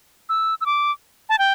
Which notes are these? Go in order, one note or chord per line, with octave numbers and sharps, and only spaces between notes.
E6
E6
D6
A5
G5